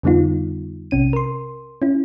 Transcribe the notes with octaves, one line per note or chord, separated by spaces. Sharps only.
F2 D3 G3 B3 D#4 F4
B1 C3 C#4 D#7
A#4 C6
C#4 E4